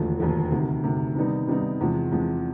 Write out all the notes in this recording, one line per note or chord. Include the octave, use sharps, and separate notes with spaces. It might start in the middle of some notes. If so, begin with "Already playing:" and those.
Already playing: E1 D#2 D3 F3 A3
E1 D#2 D3 F3 A3
D2 C3 D#3
D2 C3 D#3
C3 D#3 G3 B3 D#4
C3 D#3 G3 B3 D#4
E2 C3 F3 G#3
E2 C3 F3 G#3